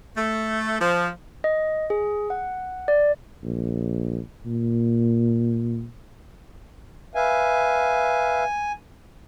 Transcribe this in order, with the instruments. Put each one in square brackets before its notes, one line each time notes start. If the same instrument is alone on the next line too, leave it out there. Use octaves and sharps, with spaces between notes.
[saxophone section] A3
F3
[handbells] D#5
G#4
F#5
D5
[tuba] A#1
A#2
[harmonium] B4 E5 F5 [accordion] G#5